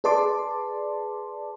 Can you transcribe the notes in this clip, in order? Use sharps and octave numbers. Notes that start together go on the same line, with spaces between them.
G#4 B4 D5 A5 C6 D6